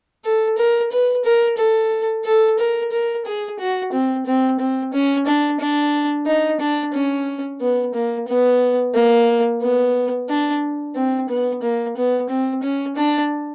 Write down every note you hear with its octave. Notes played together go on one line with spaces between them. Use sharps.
A4
A#4
B4
A#4
A4
A4
A#4
A#4
G#4
F#4
C4
C4
C4
C#4
D4
D4
D#4
D4
C#4
B3
A#3
B3
A#3
B3
D4
C4
B3
A#3
B3
C4
C#4
D4